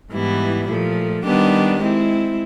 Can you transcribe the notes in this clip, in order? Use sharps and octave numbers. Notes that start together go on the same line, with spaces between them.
G#2 E3 G3 B3 E4
A#2 F3 A3
D#3 G3 B3 D4 G4
G#3 C4 E4